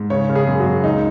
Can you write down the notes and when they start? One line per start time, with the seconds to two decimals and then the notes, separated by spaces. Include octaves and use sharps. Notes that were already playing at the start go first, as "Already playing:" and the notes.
Already playing: G#2
0.10 C#3 C#5
0.29 C#3
0.35 G#4
0.47 F#2
0.60 F#4
0.66 F#2
0.84 C#2 D#4